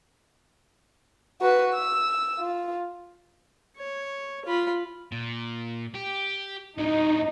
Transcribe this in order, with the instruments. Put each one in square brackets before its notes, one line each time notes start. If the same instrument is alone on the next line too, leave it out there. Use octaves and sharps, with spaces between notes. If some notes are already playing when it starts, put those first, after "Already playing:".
[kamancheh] F#4 B4
E6
F4
[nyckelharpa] C#5
F4 B5
[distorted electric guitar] A#2
G4
[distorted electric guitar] A2 F#3 [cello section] D#4